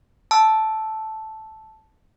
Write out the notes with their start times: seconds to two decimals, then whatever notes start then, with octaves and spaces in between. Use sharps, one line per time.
0.31 A5 E6